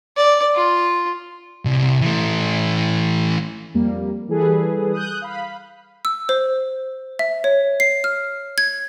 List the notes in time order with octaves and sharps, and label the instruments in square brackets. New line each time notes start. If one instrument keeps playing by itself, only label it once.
[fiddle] D5
F4
[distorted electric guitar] C2
E3 A3
[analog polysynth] F2 G3 A#3
E3 G3 G#4 A4 B4
D#6 F#6 G6
F5 B5
[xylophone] E6
C5
E5
C#5
C7
F6
G#6